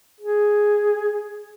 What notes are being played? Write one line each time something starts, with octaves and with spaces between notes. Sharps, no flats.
G#4